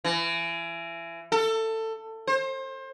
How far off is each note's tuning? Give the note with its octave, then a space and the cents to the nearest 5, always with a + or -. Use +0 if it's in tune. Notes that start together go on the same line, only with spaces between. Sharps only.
E3 +30
A4 +20
C5 +30